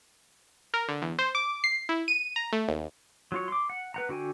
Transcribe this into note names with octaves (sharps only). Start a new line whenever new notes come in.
A#4
D3
E2
C5
D6
C7
E4
D#7
A#5
A3
D#2
F#3 F4 C#5
C6 D6
F#5
B4 F#5 A#5
D3 F#4 G5 G#5